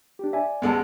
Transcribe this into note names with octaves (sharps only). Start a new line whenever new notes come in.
D4 G4
D5 E5 G#5
A1 D2 G#3 B3 A4 A5